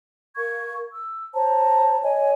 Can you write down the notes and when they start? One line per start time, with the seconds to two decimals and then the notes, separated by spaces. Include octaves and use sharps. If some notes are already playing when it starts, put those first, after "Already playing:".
0.37 A#4 F5 C#6 G#6
0.92 E6
1.34 C5 C#5 A5 A#5
2.03 C#5 D#5 G#5